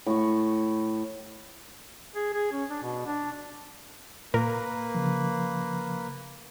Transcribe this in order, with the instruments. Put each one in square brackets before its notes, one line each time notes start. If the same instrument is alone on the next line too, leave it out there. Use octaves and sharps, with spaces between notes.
[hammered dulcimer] A2 C#6
[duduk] G#4
G#4
C#4
D4
B2
D4
[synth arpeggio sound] A#2 A#4 [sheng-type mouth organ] A#3 B4
[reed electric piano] C#3 F3